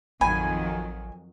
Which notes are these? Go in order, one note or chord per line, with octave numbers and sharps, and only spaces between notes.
A1 F2 D#3 F#3 G#5 B5